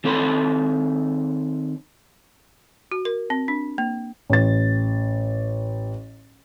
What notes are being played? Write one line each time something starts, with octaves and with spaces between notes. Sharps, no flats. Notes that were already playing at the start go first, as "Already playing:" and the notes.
D#3 C4 A4 C#5 B5 C6
F#4
A#4
C4
D4
A#3
A1 A6